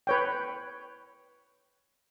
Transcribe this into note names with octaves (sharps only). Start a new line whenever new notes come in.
B4 C#5 G5